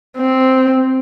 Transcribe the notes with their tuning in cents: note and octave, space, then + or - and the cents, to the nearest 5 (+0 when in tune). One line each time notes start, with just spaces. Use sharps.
C4 -5